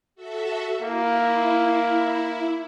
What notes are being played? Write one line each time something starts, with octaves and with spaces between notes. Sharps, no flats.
F#4 A4 E5
A#3 E4